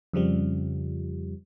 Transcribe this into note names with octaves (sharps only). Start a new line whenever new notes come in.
F2 C#3 F3 G3